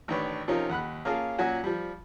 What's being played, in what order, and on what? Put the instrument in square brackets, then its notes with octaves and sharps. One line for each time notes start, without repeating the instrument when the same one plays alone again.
[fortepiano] A1 D#3 D4 B4 C#5
C3 F3 C#4 D#4 F4 A#4
D#2 F#5 B5 F#6
A#3 C#4 F4 G#4 F5 A5
A#2 F#3 C#4 F#4 F#5 G#5
F3 G3